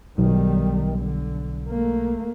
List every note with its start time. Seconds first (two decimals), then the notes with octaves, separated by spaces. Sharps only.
0.18 B1 D#3 G3
0.98 D3
1.69 A3 A#3